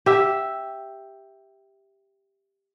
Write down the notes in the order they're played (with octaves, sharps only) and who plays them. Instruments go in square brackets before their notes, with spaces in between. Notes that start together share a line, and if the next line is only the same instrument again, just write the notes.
[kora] G4 E5